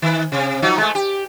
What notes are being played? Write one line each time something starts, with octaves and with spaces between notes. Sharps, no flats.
D#3
C3
F3 F#3 D#4
G#3 A3
G4